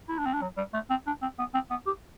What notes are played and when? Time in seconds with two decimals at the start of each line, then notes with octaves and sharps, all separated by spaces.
0.09 E4
0.18 D4
0.26 C4
0.34 D4
0.42 F#3
0.57 G3
0.74 A3
0.90 C4
1.07 D4
1.22 C4
1.39 B3
1.54 C4
1.70 B3
1.87 G4